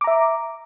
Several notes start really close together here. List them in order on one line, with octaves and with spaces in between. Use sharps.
D6 A#5 E5